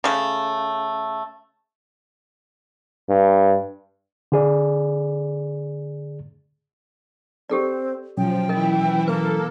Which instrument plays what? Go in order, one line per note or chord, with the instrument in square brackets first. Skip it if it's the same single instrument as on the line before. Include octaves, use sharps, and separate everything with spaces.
[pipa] C#3 A3
[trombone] G2
[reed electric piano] D3 G#4 D5
[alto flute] C4 [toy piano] G4 A4 D5
[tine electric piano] B2 F#3 C#4 [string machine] F3 [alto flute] G5
[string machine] E3 E4 [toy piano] A#4 D#5
[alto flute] A#3 [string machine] A4 [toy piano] B4